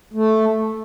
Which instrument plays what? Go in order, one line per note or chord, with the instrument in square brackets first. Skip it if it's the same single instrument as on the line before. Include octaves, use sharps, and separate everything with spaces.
[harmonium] A3